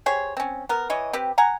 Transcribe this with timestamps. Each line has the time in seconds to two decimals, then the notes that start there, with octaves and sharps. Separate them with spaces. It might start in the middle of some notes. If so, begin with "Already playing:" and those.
0.06 G4 G#4 C5 C#5
0.37 C4 C#4
0.69 B3 A#4
0.90 E3 C#5 D#5
1.13 C4 G4 B4
1.38 F#5 G#5 A#5